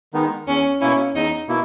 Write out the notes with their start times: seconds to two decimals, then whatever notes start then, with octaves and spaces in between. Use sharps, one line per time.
0.14 D#3 G#3 B3 D#4
0.47 E2 C#4
0.80 B2 A#3 C#4 E4
1.15 E2 D#4
1.48 B2 A#3 E4